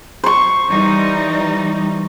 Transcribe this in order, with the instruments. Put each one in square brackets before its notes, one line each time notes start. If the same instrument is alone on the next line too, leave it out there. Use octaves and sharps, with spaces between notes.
[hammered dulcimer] C5 C#6
[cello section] E3 G3 D#4